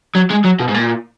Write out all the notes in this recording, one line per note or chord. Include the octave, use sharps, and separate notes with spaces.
F#3
G#3
F#3
B2
G#2
A#2